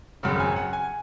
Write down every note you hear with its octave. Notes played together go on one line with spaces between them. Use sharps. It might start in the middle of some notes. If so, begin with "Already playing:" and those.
G#1 F#2 C#3 F#5
G#5
F#5
G#5